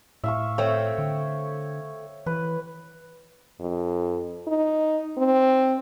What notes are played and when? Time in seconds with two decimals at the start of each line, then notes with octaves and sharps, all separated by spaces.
0.24 A2 E5 F5 C#6
0.58 A3 C4 C#5 G5
0.98 D3
2.26 E3 B4
3.60 F2
4.47 D#4
5.18 C4